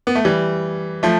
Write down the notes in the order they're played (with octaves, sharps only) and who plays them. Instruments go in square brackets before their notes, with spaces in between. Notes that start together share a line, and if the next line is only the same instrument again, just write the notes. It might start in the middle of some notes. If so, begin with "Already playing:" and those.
[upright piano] B3
A3
E3 G3
F3 A3